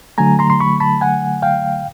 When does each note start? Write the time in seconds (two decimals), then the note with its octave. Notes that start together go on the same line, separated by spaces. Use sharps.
0.18 D3 F#3 A3 G#5 A#5
0.39 A#5 C6
0.50 C6
0.60 B5 C#6
0.80 A5 B5
1.01 F#5 G#5
1.42 F5 G5